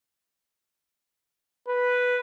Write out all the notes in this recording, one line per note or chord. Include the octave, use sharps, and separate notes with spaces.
B4